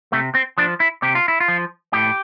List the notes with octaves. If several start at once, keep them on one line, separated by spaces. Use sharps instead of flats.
C3 A3
C4
F3 D4
E4
C3 G4
F4
E4
F4
F3
A2 G4